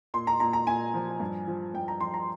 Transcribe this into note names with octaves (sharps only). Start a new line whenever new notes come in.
A#2 C6
A#5
A#2 A#5
A#5
A#2 G#5
F3
G2
F3
G2 G5
A#5
F3 C6
A#5